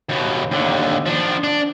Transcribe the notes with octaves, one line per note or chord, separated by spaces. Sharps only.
D#2 B2
D#2 D3
F3 D4
D4 D5